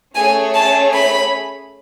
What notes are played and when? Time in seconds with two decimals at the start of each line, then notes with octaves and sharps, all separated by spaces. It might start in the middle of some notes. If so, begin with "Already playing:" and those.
0.15 A3 C#4 G#4 C#5 G#5
0.55 A5
0.95 B5